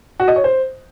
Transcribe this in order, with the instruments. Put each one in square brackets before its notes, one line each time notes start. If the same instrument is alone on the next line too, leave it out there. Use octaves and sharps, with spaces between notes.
[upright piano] F#4
D#5
C#5
C5